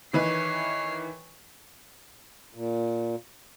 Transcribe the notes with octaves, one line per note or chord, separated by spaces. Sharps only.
D#3 E3 B4 C#5 C7
A#2